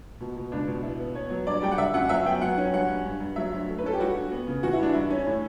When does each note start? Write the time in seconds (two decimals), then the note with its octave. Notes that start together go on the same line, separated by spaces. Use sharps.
0.21 B2
0.36 B2
0.51 C#2 D4
0.68 B2
0.83 B3 E4
0.99 B3
1.15 B3 C#5
1.30 F#3
1.47 G2 D5
1.62 G3 G5
1.71 F#5
1.78 D3 E5
1.94 F#2 F#5
2.09 F#3 E5
2.25 B3 G5
2.41 F#3 F#5
2.58 C#4
2.73 G2 F#5
2.89 G2
3.05 G2
3.20 G2
3.36 F#3 E5
3.52 D2
3.69 A3
3.78 B4
3.83 C#4 A4
3.93 G4
4.00 G3 F#4
4.16 G2
4.31 B3
4.47 C#3
4.63 E3 F#4
4.73 E4
4.79 G2 D4
4.93 G2 E4
5.10 C#4
5.27 A2